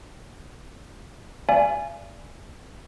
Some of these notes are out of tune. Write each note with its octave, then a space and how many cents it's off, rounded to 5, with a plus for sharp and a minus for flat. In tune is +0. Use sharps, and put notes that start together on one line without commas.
D5 +0 F5 -45 G#5 +0